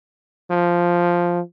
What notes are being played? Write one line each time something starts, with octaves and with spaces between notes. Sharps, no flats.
F3